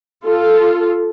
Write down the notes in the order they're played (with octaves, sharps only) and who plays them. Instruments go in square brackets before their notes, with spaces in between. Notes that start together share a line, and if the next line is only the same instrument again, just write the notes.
[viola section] F4 A4